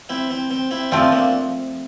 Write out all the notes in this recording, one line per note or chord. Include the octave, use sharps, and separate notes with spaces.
C4 E4
C4
C4
C4 E4
F3 A3 C4 D4 F4
A#3 D4